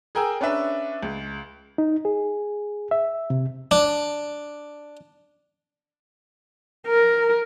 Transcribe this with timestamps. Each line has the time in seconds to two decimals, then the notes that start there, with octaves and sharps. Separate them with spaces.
0.15 G#4 A#4 G5 G#5 E6
0.41 C#4 D4 B4 E5
1.03 C#2
1.78 D#4
2.05 G#4
2.91 E5
3.30 C3
3.71 D4
6.87 A#4